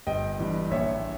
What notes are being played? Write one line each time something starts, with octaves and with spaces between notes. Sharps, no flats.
G1 D#5 G5
G2 E3 G3
A#1 C#5 E5